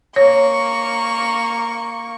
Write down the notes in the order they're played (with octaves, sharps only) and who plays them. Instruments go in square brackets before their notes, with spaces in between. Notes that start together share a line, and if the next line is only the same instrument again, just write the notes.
[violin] A#3 C#6 [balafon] C#5